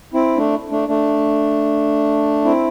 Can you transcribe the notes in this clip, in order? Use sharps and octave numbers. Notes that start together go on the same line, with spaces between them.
C4 E4
A3 D4
A3 D4
A3 D4
C4 E4